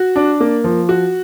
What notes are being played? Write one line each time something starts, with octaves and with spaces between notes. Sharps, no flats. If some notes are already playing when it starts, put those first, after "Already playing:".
Already playing: F#4
D4
A#3
F3
F#4